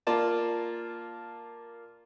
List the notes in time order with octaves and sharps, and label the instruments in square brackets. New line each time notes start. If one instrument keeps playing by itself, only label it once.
[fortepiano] A#3 F4 D5 A5